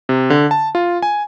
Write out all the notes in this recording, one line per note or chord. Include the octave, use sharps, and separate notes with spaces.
C3
D3
A5
F4
G#5